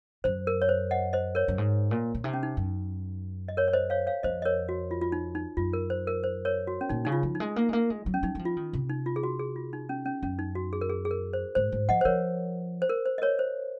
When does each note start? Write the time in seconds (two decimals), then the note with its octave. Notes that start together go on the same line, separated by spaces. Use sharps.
0.24 F#2 C5
0.47 A#4
0.62 C#5
0.69 C5
0.91 D#5 F#5
1.13 C5 D#5
1.35 A#4 C#5
1.48 F#2
1.58 G#2
1.91 A#2
2.15 A#2
2.24 C3 D#4
2.33 C#4
2.43 D#4
2.57 F#2
3.48 D#5
3.57 A#4 C#5
3.68 C#5
3.73 C5 D#5
3.90 C#5 F5
4.07 C#5 F5
4.23 F2 C5 D#5
4.42 D#5
4.45 A#4 C#5
4.69 F#4
4.91 F4
5.01 F4
5.12 D#4
5.35 D#4
5.57 F#2 F4
5.73 A#4
5.90 C5
6.07 A#4
6.24 C5
6.45 A#4 C#5
6.67 F#4
6.81 C#4
6.89 A#2 D#4
7.05 C#3 D#4
7.12 F4
7.23 F3
7.35 D#4
7.40 G#3
7.56 A#3
7.69 G#3
7.73 A#3
7.90 G#3
8.06 F#3
8.14 C#4
8.23 F#3 D#4
8.35 F#3
8.39 F3
8.45 F4
8.57 D#3
8.73 C3
8.89 D#4
9.06 F4
9.16 G#4
9.23 F#4
9.39 G#4
9.56 F4
9.73 D#4
9.89 C#4
10.05 C#4
10.22 F#2 C#4
10.39 D#4
10.55 F#4
10.73 G#4
10.81 A#4
10.89 G#4
11.05 G#4
11.11 A#4
11.33 C5
11.55 G#2 C5
11.72 G#2
11.89 F3 D#5 F#5
12.01 C5
12.05 F3 A#4 C#5
12.82 C5
12.89 A#4
13.06 C5
13.18 D#5
13.22 A#4 C#5
13.39 C5